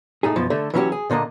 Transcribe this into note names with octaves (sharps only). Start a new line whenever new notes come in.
A2 A3 D#4 G#4
F#2 B2 F3
D3 A3
E3 F#3 C#4 D4 F#4 G4
G#4
A#2 D3 A#3 D4 D#5